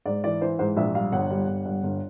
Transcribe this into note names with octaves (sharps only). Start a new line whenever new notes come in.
G#2 D5
E3 D5
E3 C5
G#2 C5
A#1 E5
G3 F5
G1 F#5
G3
G1
G2
G1